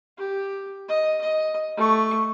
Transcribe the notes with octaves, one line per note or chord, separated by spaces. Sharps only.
G4
D#5
D#5
A3 C#6